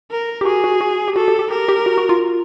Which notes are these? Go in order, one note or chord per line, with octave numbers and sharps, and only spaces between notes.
A#4
G4
F#4 G#4
F#4
F#4
G4
F#4 A4
G4
G4
G4 A#4
G4
F#4
F#4
F4